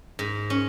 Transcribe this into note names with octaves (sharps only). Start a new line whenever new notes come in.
G#2
C#4